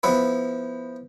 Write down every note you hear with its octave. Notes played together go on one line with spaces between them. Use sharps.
F3 B3 E4 B4